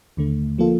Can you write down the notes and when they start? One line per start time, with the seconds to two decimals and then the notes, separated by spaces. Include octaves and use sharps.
0.17 D#2 D3 A3
0.58 F3 A#3 F4 A4